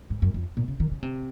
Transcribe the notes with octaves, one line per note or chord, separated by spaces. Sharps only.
G#2
F#2
F2
A#2
C#3
D#3
C#3
C3